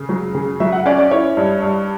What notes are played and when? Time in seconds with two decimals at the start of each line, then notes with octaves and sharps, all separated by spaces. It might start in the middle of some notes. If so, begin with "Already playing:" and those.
Already playing: C#3
0.09 F#3
0.34 C#3
0.60 F#3 E5
0.72 F#5
0.86 C#4 D5
0.98 D5
1.11 E4 C#5
1.37 G2
1.62 G2